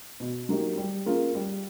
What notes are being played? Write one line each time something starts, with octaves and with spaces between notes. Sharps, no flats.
B2
F#3 A#3 D#4 G4
G3
A#3 C#4 F4 G#4
G3